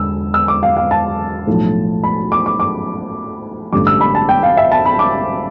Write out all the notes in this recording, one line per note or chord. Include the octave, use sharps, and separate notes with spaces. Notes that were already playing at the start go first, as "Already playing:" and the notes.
Already playing: E1 D3 E6
E6
D6
F5
F5
A5
B1 A2 F3
B5
D6
D6
D6
A1 G2 D3 G3 D6
E6
B5
A5
G5
F5
E5
A5
B5
D6